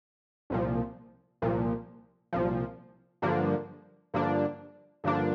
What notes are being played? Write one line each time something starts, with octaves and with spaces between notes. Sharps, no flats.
C2 A#2 F3
C2 A#2 F3
C2 A#2 F3
G2 D3 F3 A#3 D4
G2 D3 F3 A#3 D4
G2 D3 F3 A#3 D4